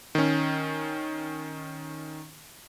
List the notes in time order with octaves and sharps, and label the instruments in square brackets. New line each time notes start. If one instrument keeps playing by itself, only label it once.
[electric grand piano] D#3 C#4